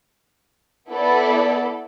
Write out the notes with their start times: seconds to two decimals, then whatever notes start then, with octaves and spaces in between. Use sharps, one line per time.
0.91 B3 E4 A4 D5